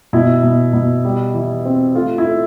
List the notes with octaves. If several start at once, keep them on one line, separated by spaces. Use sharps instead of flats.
B2 E4
B2
B2
G3
E3
C4
A3 F4
E4
A3